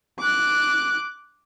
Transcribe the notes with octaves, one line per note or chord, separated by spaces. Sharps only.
D6 F#6